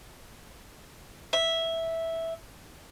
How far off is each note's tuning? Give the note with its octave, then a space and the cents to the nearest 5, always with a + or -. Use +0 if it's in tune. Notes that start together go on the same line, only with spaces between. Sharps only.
E5 -5